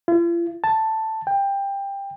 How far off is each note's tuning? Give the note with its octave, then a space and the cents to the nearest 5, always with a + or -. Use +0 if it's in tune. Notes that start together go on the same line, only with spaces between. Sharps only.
F4 -45
A5 +5
G5 +15